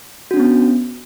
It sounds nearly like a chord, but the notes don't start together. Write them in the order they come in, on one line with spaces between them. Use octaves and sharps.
F#4 D4 C#4 B3